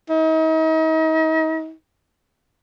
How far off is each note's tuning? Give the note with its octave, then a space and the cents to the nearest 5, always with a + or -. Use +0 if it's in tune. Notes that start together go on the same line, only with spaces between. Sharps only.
D#4 +40